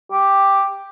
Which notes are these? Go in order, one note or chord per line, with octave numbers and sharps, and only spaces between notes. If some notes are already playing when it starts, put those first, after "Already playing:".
G4